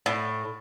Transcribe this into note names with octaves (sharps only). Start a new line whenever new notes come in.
A2